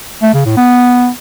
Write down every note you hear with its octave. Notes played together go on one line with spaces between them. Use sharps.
A3
C#3
A2
B3